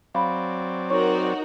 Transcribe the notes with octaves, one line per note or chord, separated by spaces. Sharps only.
F#3 C4 D5 F5 B5
D#4 F#4 A#4 C#5 C#6